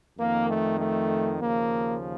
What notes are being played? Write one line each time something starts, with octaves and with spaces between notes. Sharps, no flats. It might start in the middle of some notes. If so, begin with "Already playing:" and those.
F2 D#3 A#3
A3
A3
D#2 C#3 F3 A#3